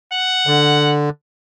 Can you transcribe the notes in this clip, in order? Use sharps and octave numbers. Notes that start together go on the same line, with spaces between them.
F#5
D3